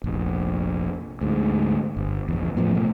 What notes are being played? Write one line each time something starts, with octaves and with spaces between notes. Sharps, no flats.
F1 A#1
D2 G#2
G1
A#1 E2
A2 F3 B3
B2 A3